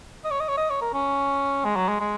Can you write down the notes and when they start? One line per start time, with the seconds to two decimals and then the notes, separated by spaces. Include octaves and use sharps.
0.25 D#5
0.31 C#5
0.40 D#5
0.48 C#5
0.57 D#5
0.70 C#5
0.82 A#4
0.94 C#4
1.65 G#3
1.76 F#3
1.89 G#3
2.00 G#3